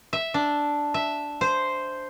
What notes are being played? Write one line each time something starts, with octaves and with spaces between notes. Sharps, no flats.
E5
D4
E5
C5